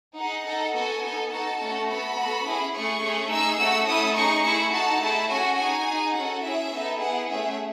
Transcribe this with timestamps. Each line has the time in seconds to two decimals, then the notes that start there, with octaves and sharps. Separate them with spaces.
0.17 D#4 G#4 F#5
0.45 D#4 A4
0.74 B3 F#4 A4 G#5
1.03 B3 D#4 A4
1.31 D#4 F#4 A4 A5
1.60 A3 C#4 F#4 A4
1.88 B3 F#4 A4 B5
2.17 B3 F#4 A4
2.45 C#4 E4 G#4
2.74 A3 C#4 G#4 C#6
3.03 A3 C#4 G#4
3.31 D#4 G#4 E6
3.59 A3 C#4 F#4 A4 E6
3.88 A3 C#4 E4 A4 D#6
4.16 D#4 G#4 C#6
4.44 A3 E4 G#4 C#6
4.73 D#4 F#4 A4 A5
5.01 A3 E4 G#4
5.30 C#4 F#4 A4 G#5
5.58 D#4 G#4 G#5
5.87 D#4 G#4
6.15 C#4 F#4 A4 F#5
6.44 C#4 E4 G#4 E5
6.73 B3 D#4 A4
7.01 B3 E4 G#4 F#5
7.30 A3 C#4 G#4 E5